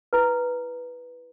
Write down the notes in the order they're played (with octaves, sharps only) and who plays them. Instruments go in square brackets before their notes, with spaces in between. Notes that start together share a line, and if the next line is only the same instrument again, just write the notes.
[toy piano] E4 B4